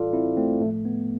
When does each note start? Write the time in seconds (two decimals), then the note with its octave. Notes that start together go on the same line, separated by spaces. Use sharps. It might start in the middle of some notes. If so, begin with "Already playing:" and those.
Already playing: A2 E3 G3 F4 A4 D5 F5
0.13 C4 E4
0.37 A3 C4
0.61 A2 A3
0.65 F3
0.85 B3